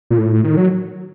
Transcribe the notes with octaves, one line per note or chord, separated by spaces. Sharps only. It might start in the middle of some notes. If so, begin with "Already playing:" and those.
A#2
A2
D#3
F#3